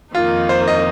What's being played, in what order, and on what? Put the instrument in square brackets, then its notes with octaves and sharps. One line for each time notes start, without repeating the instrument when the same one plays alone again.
[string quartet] F2 D#3 A#3 D#4 [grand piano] F4
[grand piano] C5
D#5